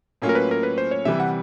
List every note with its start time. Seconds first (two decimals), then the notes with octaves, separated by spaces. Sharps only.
0.22 A2 F#3 A#3 C#4 F4
0.29 A#4
0.35 B4
0.51 A#4
0.63 B4
0.78 C5
0.91 C#5
1.05 C3 E3 G3 E5
1.20 F#5